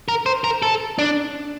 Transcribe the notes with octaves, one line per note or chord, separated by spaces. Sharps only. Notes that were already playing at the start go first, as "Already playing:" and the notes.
A#4
C5
A#4
A4
D4